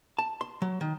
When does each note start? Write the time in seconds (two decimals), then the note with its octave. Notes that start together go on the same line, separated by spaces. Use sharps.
0.19 A5
0.41 C6
0.62 F#3
0.81 D#3